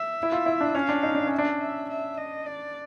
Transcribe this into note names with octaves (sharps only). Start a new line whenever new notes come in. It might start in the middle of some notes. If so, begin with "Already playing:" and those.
Already playing: E5
E4
F4
E4
D4
C#4 F5
D4
D#4
D4
C#4
E5
D4
E5
E5
D#5
D5